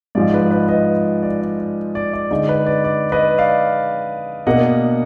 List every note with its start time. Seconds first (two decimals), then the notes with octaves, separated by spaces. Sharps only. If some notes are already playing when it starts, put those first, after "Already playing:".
0.15 G#2 F3 G#3 D5
0.34 B4
0.51 B4 D#5
0.69 B4 D#5
1.23 D5
1.42 D5
1.59 D5
1.95 D5
2.13 D5
2.30 D3 G#3 D#4 D5
2.49 B4
2.66 D5
2.84 D5
3.12 B4 D#5
3.38 D5 F5
4.47 B2 A#3 D4 D#5 F#5